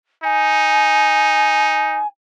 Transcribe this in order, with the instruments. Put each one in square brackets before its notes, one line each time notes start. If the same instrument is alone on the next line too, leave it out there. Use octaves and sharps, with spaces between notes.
[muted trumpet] D#4 [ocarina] G#5